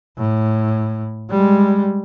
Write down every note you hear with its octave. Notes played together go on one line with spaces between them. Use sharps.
A2
G3 G#3